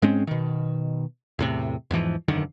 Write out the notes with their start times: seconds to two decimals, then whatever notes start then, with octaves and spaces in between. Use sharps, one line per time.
0.02 G#2 G#3 C4 C#4
0.27 B2 D#3
1.39 E2 A2 C3
1.91 E2 G#2 E3 F3
2.28 E1 F#2 D3 D#3